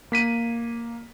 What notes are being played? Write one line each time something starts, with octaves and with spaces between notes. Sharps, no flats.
A#3 B6 D#7